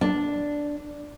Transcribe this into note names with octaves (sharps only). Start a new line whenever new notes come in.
D4